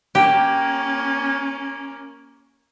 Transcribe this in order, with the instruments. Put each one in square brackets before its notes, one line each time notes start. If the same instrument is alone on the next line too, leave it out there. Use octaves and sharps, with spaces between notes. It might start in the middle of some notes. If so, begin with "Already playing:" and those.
[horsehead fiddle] A#3 C#4 [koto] G4